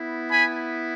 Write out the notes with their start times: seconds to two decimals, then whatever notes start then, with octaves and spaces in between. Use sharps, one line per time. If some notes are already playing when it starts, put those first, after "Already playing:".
Already playing: B3 E4
0.31 G#5 B5